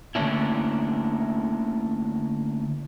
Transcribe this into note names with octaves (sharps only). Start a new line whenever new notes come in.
D3 A3 A#3 C#4 D4 E4